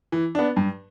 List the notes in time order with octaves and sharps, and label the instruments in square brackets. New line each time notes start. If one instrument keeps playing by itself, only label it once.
[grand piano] E3
B3 D4
G2